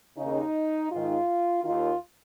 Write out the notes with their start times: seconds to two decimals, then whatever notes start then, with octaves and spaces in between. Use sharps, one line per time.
0.17 D#2 C#3 D#4
0.92 G#2 D#3 F4
1.64 D#2 D#3 F4